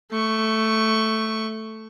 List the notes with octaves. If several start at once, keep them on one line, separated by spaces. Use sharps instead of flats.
A3 C#6